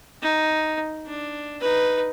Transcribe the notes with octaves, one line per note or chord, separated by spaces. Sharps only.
D#4
D4
D#4 B4